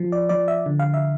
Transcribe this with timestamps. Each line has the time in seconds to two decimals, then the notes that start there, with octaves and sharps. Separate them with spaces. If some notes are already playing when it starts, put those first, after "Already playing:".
Already playing: F3
0.12 D5
0.29 F3 D5
0.48 E5
0.66 D3
0.79 F5
0.94 E5